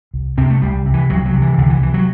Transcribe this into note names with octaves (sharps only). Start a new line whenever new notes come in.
C2
C3 C4
A3
C2 G3
C3
E3
C2 F#3
F#3
C3
E3
C2 D3
E3
C3 E3
F#3